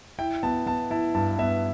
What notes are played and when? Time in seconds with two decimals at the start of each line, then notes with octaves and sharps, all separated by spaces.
0.19 E4 G5
0.43 B3 A5
0.66 B3 A5
0.91 E4 A5
1.14 G2 A5
1.38 B3 E5